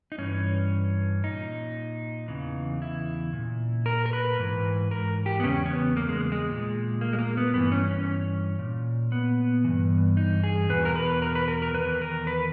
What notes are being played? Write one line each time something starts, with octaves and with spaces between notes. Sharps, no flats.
D#4
G2 E3 C#4
A#2 D#4
E2 C#3 E3
E4
A#2
A#4
A#4
B4
G#2 E3
A#4
G4
B3
E2 C#3 C#4
C#4
B3
A#3
G#3
G#3
A#2
A#3
G#3
A#3
B3
G2 E3 B3
C#4
C#4
A#2
B3
G2 E3
D#4
G#4
E2 B2 B4
A#4
B4
A#4
B4
A#4
A#4
E2 D#3 B4
A#4
B4